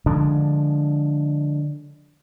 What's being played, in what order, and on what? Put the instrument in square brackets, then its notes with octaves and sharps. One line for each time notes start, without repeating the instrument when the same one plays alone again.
[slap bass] D3 F3 G#3 D4